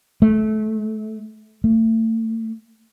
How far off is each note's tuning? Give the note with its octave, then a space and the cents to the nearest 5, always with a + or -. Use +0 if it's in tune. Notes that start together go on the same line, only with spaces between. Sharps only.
A3 -25
A3 +35